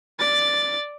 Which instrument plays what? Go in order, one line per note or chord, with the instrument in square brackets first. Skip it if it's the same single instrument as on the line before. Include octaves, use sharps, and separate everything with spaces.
[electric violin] D5 A6